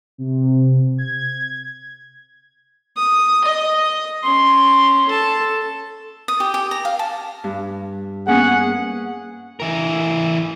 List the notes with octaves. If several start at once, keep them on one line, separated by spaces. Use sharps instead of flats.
C3
G#6
D#6
D#5
C#4 C6
A4 A5
D#6
G4
G4
A#5
F5
A5
G2
A#3 B3 C#4 G#4 F#5
E3 A#4